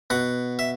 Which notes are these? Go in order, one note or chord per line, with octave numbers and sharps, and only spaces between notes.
B2 F#5
E5